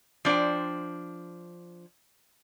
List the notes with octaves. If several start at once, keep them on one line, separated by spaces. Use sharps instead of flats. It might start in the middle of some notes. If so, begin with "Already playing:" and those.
F3 D4 C5 G5